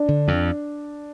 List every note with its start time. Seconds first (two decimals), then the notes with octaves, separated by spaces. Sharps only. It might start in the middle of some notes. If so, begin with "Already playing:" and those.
Already playing: D4
0.09 D3
0.28 F2